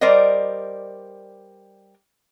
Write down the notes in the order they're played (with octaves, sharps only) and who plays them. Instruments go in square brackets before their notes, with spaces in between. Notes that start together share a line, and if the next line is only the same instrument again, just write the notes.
[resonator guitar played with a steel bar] G3 A#4 C5 D5 D#5